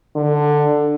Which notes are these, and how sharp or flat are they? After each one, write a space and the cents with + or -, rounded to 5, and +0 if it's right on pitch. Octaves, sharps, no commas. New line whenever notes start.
D3 +10